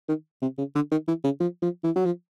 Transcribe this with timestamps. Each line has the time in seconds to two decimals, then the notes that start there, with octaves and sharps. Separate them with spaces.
0.08 D#3
0.42 C3
0.58 C#3
0.75 D3
0.91 D#3
1.08 E3
1.24 C#3
1.40 F3
1.62 F3
1.84 E3
1.96 F#3
2.06 F3